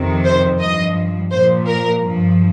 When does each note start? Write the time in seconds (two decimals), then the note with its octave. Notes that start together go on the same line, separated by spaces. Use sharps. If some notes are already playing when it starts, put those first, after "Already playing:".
Already playing: F2 C3 D#3
0.25 C5
0.60 G2 F3 D#5
1.31 A#2 F3 C5
1.67 A#4
2.02 G2 F3